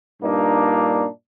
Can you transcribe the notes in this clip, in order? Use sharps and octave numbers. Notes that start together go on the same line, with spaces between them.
G2 A#2 A#3 D4 D#4